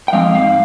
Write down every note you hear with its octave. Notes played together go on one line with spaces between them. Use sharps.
G5
F3 G#3 C4 F5
G#2 F5